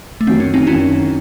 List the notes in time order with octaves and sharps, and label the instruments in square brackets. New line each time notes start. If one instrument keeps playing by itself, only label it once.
[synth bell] A3
[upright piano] F#2 D#3 F#3 [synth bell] C4
[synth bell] C#4
C4 D#4
[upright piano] F#2 D#3 F#3 [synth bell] C#4 E4